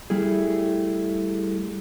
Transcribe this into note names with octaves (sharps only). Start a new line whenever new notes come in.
G3 A3 E4 G#4